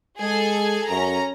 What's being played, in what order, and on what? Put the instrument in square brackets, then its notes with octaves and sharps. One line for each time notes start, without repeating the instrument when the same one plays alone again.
[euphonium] G#3 [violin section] G#4 A4 G#5
[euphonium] F#2 [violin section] C#4 A#5